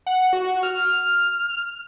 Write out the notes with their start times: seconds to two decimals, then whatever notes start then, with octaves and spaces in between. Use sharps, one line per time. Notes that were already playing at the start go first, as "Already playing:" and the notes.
0.06 F#5
0.33 F#4
0.63 F6